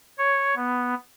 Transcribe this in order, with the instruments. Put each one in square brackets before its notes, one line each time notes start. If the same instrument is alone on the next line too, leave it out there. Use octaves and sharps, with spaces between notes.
[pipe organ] C#5
B3